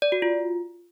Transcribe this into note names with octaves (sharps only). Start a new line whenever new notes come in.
D5
F#4
F4